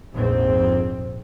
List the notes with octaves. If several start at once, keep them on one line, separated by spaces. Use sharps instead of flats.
A#1 F2 G#2 F3 C4